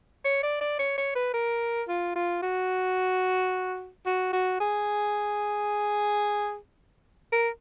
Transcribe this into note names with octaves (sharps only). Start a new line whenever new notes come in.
C#5
D5
D5
C#5
C#5
B4
A#4
F4
F4
F#4
F#4
F#4
G#4
A#4